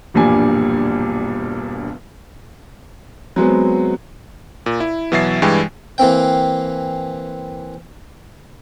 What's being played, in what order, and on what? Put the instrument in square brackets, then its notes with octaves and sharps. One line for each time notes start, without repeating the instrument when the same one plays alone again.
[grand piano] E1 A#1 G2 A#2 G3 G#5
[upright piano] F#3 G#3 B3 C4
[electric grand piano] A#2
E4
B2 E3 F#3 E5 A6 C7
G2 E3 G#3 G5 G#5
[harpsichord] E3 A#3 C4 G5